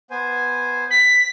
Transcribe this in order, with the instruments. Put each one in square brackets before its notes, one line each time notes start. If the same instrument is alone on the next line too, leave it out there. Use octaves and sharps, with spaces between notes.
[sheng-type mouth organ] B3 C5 G#5
[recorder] B6